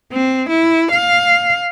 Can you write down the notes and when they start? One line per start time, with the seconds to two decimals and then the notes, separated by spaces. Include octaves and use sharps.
0.12 C4
0.49 E4
0.92 F5